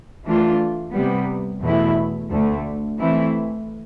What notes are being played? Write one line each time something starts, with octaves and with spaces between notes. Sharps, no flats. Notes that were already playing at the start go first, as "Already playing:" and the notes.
E3 A3 D4 F4
C3 G3 B3
E2 B2 A3 E4
D2 D3 A3
E3 A3 C4 E4